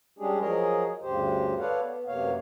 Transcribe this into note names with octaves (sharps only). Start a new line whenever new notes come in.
G3 G#3 C#4 D4 G4 G#4
F3 F#3 G#4 A#4 C#5 D#5
D2 G2 C#3 G4 C5
A4 B4 C#5 D5 F5 F#5
B3
F#2 C3 A#3 B3 C#5 F5